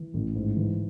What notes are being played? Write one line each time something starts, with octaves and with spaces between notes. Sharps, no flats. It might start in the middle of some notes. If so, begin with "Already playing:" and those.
Already playing: E3
A1
G#2
E3